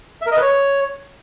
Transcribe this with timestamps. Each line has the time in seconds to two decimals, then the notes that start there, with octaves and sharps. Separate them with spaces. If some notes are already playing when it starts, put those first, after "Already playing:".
0.21 E5
0.26 A#4
0.32 D#5
0.37 B4
0.42 C#5